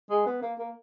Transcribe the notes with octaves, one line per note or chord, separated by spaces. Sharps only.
G#3
B3
A#3
A#3